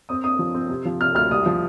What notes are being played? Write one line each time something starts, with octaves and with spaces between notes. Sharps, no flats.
C4 D#6
C4 D#6
F3
C4
C3
F3
C3 F6
D2 F6
C2 D#6
F3